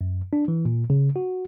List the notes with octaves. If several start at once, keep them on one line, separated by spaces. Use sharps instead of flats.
F#2
D4
E3
A#2
C#3
F#4